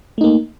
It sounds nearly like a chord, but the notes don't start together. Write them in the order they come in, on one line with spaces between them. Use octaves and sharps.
A3 D#4 A#3